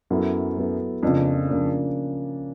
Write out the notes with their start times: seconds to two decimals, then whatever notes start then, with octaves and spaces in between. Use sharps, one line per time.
0.10 F#2 F#3 B3 E4 A4
0.56 F#3 B3 E4 A4
1.03 F2 C#3 F3 A#3 D4
1.49 C#3 F3 A#3 D4